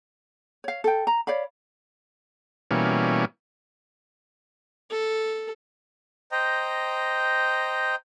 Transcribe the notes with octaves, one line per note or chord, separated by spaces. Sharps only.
C#5 F5
A4 G5
A#5
C#5 D5 F5 B5
B2 E3 G3 A#3 C#4
A4
C5 D#5 G5 A#5